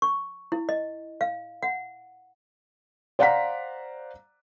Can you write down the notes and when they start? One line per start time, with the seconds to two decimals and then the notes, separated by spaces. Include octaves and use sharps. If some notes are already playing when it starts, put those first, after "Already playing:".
0.02 C#6
0.52 E4
0.69 D#5
1.21 F5
1.63 F#5
3.19 C5 D5 F5 F#5 A#5 B6